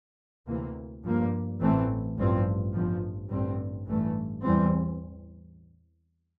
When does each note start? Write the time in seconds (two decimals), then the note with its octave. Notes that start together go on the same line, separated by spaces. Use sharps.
0.47 D2 C3 E3 A#3
1.04 G2 F3 A#3
1.60 A1 A2 E3 A3 C4
2.17 A1 G2 F3 C4
2.73 G1 G2 F3
3.30 A1 G2 D3 G3 C4
3.87 A1 G2 E3 A3
4.43 E2 E3 G3 C4